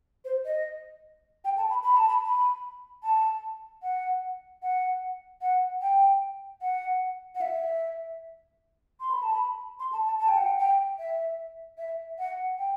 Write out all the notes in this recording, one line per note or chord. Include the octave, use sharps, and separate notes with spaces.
C5
D#5
G5
A5
B5
B5
A5
B5
B5
A5
F#5
F#5
F#5
G5
F#5
F#5
E5
C6
B5
A5
B5
C6
A5
A5
A5
G5
F#5
G5
G5
E5
E5
F#5
G5